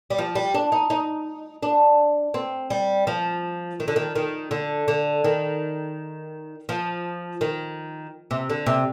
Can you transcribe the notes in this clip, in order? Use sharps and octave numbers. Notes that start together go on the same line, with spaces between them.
G3
F3
G3
D4
D#4
D#4
D4
C4
G3
F3
D#3
D3
D#3
D#3
D3
D3
D#3
F3
D#3
C3
D3
C3